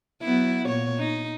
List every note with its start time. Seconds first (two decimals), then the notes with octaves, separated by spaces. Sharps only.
0.22 F#3 B3 E4
0.67 A#2 C#5
0.98 D#4